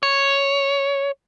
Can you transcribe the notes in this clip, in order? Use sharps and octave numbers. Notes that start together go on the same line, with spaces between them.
C#5